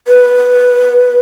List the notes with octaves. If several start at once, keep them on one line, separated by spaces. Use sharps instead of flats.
B4